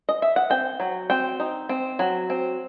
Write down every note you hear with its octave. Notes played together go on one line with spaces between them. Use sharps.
D#5
E5
F#5
C4 G5
F#3
C4 G5
D#4
C4
F#3
C4